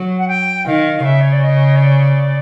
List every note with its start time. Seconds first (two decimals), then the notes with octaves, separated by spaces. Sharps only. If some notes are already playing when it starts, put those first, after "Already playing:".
Already playing: F#3
0.18 F#5
0.28 G5
0.66 D#3 F5
1.05 C#3 E5
1.21 C#5
1.32 D5
1.43 D#5
1.76 C#5
1.82 D5